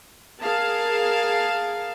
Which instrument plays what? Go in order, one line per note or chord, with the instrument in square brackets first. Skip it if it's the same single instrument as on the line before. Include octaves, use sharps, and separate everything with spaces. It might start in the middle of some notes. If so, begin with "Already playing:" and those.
[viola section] G#4 A#4 F5 A5